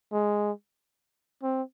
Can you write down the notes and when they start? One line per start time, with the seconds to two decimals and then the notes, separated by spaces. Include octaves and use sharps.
0.13 G#3
1.43 C4